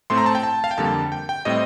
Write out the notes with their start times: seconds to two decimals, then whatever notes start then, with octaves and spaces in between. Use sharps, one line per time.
0.10 A2 A3 C4 C6
0.18 A#5
0.26 A5
0.35 G5
0.43 A5
0.64 F5
0.71 G5
0.78 F2 D3 G3 A#3 A5
1.12 G5
1.29 G5
1.45 A2 G3 C4 D#5